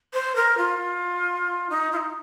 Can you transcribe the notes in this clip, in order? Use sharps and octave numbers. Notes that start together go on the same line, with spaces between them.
C5
A#4
F4
D#4
F4
D#4